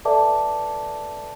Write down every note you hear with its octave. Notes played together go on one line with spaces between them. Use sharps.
A4 B4 D5 E5 A5 D6